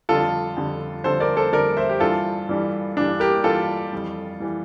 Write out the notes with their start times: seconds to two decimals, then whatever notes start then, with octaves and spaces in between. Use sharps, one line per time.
0.09 F2 D3 G3 F4 A4
0.56 F2 D3 G3
1.04 F2 D3 G3 A4 C5
1.20 A#4 D5
1.37 A4 C5
1.52 F2 D3 G3 A#4 D5
1.77 C5 E5
1.89 G4
2.00 G2 E3 G3 F4 A4
2.49 G2 E3 G3
2.96 G2 E3 G3 D4
3.20 G4 A#4
3.44 G2 E3 G3 F4 A4
3.93 F2 E3 G3
4.40 E3 G3